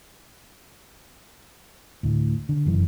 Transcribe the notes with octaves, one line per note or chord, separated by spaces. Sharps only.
D2 A2
D3
F1 F#2 E3